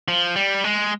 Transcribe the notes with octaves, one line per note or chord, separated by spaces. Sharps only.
F3
G3
G#3